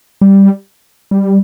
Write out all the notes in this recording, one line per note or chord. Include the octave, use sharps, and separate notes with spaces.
G3
G3